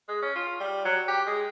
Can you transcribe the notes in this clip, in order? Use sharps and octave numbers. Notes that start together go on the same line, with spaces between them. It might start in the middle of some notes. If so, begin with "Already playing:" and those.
G#3
C#4
F4
G3
F#3
G4
G#3